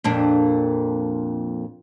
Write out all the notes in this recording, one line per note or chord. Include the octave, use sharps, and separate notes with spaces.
F2 A#2 D4